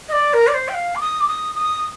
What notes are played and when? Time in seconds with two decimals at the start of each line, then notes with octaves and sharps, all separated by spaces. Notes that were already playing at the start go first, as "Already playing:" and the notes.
0.09 D#5
0.12 D5
0.33 A#4
0.47 D5
0.54 C5
0.69 G5
0.74 F5
0.95 D6
1.01 D#6
1.21 D6
1.28 D#6
1.56 D#6